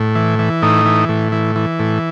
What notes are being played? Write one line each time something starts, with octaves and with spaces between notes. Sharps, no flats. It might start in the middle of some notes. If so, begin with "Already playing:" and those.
Already playing: A2
E3
E3
A2 D#4
E3
A2
E3
E3
A2